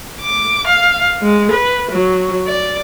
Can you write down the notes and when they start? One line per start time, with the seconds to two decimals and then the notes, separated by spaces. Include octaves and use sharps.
0.21 D6
0.67 F5
1.22 G#3
1.52 B4
1.91 F#3
2.47 D5